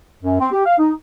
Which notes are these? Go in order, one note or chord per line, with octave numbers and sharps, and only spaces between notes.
F#2
C4
G4
F5
D#4